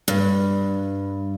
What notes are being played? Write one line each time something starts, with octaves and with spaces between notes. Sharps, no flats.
G2